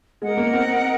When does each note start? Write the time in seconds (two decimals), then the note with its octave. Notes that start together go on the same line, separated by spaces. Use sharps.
0.21 G#3 A#4 D#5 F#5
0.37 A#3
0.53 C4